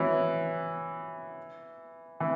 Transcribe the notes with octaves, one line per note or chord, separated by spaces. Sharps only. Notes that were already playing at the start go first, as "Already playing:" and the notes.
Already playing: E3 F#3
E3